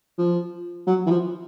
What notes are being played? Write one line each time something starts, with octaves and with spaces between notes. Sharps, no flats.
F3
F#3
E3
F3